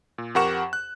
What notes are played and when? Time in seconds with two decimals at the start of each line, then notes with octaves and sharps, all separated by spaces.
0.18 A#2
0.35 F2 G4 A#4 F#5 C#6 E7
0.73 F#6